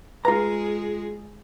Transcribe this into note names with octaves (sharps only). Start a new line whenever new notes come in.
G#3 F4 G#4 B4 A#5